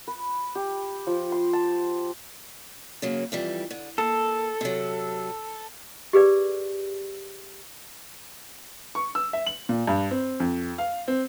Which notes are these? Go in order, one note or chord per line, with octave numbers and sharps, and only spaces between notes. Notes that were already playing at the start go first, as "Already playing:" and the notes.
B4
G4
F3
C6
A5
C#3 F#3 A#3
F2 E3 G3
D3
A#3 A4
C3 F#3
G4 G#4 B4 D5
C#6
E6
E5
F#7
A#2
G2
C4
F2
F5
C4